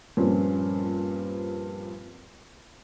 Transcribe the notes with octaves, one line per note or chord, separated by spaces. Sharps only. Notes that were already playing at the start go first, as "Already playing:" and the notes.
G2 A#2 F3 C4 C#4